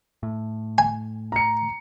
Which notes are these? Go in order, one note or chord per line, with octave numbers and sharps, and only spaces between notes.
A2
G#5
A#5 C#7